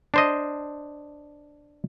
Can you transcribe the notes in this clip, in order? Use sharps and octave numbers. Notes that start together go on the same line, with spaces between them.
D4 C5 D#5